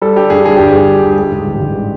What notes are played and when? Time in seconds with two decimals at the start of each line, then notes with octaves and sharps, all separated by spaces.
0.02 G3 A4
0.15 D3 G4
0.30 G2 G#4
0.44 G3 G#4
0.57 G1 G4
0.68 G#4
0.74 G1
0.88 G3
1.03 G1
1.12 G#4
1.18 G#3 G4
1.32 G#2
1.47 A1
1.62 G#2